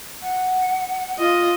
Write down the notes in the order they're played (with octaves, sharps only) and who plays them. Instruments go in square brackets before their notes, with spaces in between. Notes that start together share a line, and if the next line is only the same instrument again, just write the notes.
[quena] F#5
[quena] F4 [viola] D#5